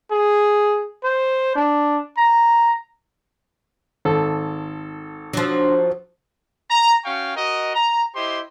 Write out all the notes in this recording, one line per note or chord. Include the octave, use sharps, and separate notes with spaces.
G#4
C5
D4
A#5
G#1 A4
F3 F#3 D4 C6
A#5
C#4 F#4 F5 G5 C#6
F#4 A#4 D#5
A#5
E4 G4 C5 D#5 C6